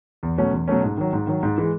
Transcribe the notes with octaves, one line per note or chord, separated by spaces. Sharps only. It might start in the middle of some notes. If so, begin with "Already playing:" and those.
E2
B2 F#3 A3 C#4
E2
B2 F#3 A3 C#4
G#2
D#3 F#3
G#2
D#3 F#3
G#2
E3 G#3